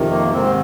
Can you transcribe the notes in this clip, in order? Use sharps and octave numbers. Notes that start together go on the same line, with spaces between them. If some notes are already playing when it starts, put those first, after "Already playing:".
Already playing: F2 C3 D#3
A#3
G#2 D#3 C4